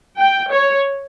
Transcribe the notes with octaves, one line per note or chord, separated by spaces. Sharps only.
G5
C#5